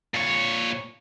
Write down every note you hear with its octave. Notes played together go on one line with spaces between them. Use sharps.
A#2 C#5